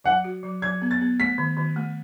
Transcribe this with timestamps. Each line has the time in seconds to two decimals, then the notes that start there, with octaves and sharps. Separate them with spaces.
0.04 F#3 F#5
0.24 F#4
0.43 F#3
0.62 F#3 G#6
0.82 B3
0.91 A6
1.01 B3
1.19 A3 B6
1.38 D#3
1.57 D#3
1.76 A3